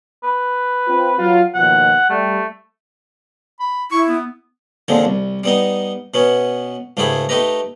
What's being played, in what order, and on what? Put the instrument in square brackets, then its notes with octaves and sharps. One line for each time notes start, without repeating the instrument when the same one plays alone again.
[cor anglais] B4
[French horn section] C4 F4
F#3 F4
[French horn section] D#2 B2 F3 [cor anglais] F#5
[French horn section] G3 [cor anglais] A3
[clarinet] B5
[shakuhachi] E4 [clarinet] C#6
[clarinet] B3
[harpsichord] D#2 D3 F3 G#3 C4
C2
G3 B3 D#4
B2 B3 C#4
C#2 G#2 A3 G4 G#4 B5
A3 D#4 G4 B4 A#5